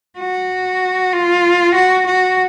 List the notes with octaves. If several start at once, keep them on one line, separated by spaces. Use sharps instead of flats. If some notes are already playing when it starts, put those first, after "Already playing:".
F#4
F4
F#4
F#4